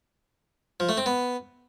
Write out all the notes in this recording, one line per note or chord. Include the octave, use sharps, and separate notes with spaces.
F3
A3
C4
B3